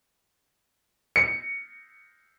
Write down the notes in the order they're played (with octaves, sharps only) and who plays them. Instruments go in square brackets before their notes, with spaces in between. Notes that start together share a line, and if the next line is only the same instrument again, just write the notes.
[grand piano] C#7